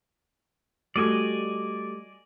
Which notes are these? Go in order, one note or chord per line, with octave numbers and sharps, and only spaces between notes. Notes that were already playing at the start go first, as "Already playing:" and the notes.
G3 A3 F#4 D5 D#5 G#5